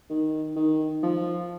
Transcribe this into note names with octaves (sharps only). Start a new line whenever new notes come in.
D#3
D#3
F3